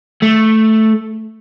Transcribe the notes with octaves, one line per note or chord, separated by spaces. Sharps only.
A3